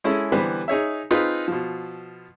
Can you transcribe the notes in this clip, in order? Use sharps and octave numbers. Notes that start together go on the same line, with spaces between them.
G#3 C#4 E4 G#4 A4
D3 E3 G3 B3 B4 C5
D#4 G#4 C#5 E5
C4 D#4 F4 G#4 B4
B2 F3